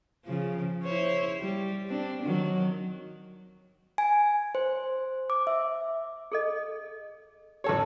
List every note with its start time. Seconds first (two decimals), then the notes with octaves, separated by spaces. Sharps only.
0.26 C#3 F3
0.84 E4 C5 C#5
1.39 G3
1.89 C4 D4
2.23 D#3 F#3
3.98 G#5
4.55 C5
5.30 D6
5.47 E5
6.32 G#4 A4 D#5
7.64 A1 G4 A4 C#5